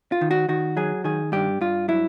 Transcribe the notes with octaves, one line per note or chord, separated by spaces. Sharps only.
F4
D#3
F#4
D#3 F#4
F#3 G#4
D#3 G#4
G2 G4
G2 F4
F#3 E4